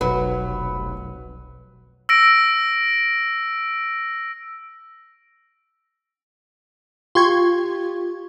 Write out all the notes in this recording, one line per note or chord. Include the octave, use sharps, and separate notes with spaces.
F1 B1 F#3 B4
E6 A#6 D7
F4 G4 C6 C#6 G#6